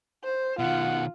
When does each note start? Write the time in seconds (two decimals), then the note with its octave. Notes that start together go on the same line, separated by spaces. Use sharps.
0.24 C5
0.59 B2 D#3 F4 F#5